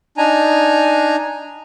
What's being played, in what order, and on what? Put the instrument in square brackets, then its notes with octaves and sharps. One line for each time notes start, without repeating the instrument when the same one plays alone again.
[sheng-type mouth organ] D4 D#4 G#5 A#5